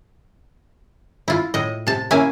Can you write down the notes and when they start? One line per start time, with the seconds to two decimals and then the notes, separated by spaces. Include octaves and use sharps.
1.28 E4 F4
1.54 A2 D#5
1.87 C3 A5
2.11 A#3 C#4 E4 E5 F5 G#5